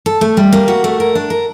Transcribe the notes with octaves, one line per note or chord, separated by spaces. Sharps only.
A4
A3
G3
A#3
F#4
A3
A#4
D4
A#4